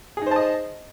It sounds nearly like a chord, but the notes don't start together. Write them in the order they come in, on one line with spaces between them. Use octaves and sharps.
G#4 D#4 C5 A5 D#5